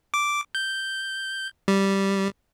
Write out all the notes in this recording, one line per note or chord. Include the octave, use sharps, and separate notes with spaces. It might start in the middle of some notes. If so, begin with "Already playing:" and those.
D6
G6
G3